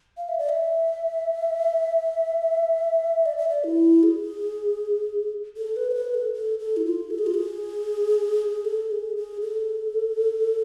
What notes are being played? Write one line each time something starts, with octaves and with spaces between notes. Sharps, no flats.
F5
E5
D5
E5
D5
E5
D5
E4
G#4
A4
B4
C5
B4
A4
A4
A4
E4
F4
A4
G#4
F4
G#4
A4
G#4
G#4
A4